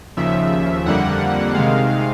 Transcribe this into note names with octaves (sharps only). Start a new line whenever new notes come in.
D#2 C#3 F3 E5
F2 D3 G3 A#3 F#5
C3 D#3 G#3 F5